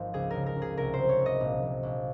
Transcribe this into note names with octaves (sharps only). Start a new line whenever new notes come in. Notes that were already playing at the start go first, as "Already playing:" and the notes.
Already playing: G#1 F3
C#2 G#4
A#4
C#3
A#4
C#2
G#4
C2 A#4
F#3 C5
C#5
C2
D#5
A#1
A#1
A#1